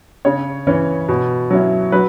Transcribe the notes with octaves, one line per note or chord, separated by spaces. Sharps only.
C#3 C#5
E3 C#4
B2
F#3 C#4 E4
F#3 B4